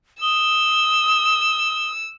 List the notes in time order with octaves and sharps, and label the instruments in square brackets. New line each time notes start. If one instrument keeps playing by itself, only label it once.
[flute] D#6 [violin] E6 [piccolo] G7